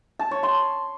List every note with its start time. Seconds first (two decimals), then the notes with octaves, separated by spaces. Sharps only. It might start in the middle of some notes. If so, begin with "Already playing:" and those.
0.19 A5
0.31 C#5
0.43 C6